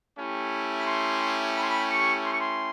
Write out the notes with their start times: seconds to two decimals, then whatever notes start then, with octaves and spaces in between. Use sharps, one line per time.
0.17 A3 C#4 E4 G4
0.79 B5
0.87 C6
1.56 B5
1.63 C6
1.70 B5
1.90 C#6
2.25 C6
2.33 C#6
2.40 C6